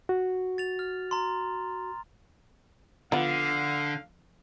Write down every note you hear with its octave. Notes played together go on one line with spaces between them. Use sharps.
F#4
A6 F7
F6
A#5 C6
D3 F3 B3 F4 F5